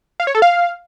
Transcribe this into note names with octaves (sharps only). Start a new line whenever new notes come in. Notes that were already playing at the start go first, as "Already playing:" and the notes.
F5
C#5
A4
F5